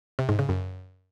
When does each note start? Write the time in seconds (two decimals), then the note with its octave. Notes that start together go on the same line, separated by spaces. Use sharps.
0.19 C3
0.29 G#2
0.39 C#3
0.49 F#2